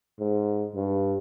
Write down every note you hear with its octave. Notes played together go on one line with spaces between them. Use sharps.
G#2
G2